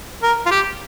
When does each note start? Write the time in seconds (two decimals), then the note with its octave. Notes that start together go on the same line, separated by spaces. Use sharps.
0.23 A#4
0.46 F4
0.51 G4